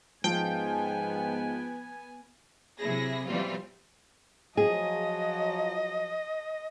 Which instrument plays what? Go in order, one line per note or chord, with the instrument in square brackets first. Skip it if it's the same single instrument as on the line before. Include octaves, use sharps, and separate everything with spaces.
[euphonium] G#2 [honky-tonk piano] F3 [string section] B3 G#5 [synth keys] G5
[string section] C3 F#3 E4 G#4 A#6
B2 E3 F#3 G3 C4 F4
[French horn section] F3 F#3 [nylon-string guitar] G#4 [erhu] D#5